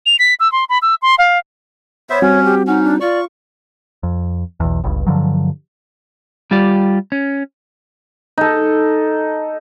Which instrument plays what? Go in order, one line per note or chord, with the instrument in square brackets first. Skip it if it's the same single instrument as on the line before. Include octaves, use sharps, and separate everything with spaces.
[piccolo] F7
B6
E6
C6
B5
E6
C6
F5
[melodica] B3 C5 E5 [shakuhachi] C#5
[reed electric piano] G3 C4 F#4 [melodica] C#4
[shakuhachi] G4
[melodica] C#4 [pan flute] D#4 [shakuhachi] F#5
[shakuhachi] D4
[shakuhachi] F4 [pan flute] D5 [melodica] C#6
[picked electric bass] F2
B1 E2
G1 C#2 G2
G2 D3 F3 F#3
[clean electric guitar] G3 F4 G4 D5
C#4
[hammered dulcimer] D#4 A4